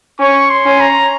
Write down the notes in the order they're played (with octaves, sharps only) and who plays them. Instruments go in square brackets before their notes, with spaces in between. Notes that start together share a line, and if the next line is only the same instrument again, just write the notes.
[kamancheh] C#4 [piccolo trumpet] C#6
[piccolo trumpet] C6
[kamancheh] C#4
[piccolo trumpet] A#5